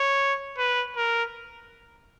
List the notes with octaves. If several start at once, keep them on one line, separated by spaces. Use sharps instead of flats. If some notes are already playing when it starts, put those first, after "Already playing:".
Already playing: C#5
B4
A#4